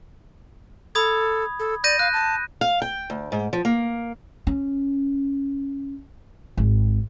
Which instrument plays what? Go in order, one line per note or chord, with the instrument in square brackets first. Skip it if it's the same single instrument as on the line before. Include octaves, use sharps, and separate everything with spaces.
[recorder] A4 [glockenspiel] B5 D#6 G#6
[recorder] A4
[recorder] D5 [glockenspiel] G6 A#6 D#7
[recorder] F5 [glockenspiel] F#6
[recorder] A5
[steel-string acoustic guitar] F5
G5
D2
G#2
F3
A#3
[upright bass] C#4
G#1